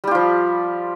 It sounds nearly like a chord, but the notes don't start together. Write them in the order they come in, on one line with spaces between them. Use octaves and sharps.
G3 G4 F4 F3